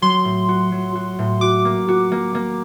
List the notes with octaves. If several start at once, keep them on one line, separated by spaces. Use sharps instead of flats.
F#3 C6
A2
F#4
F#3
F#4
A2
F#4 D6
A#3
F#4
A#3
A#3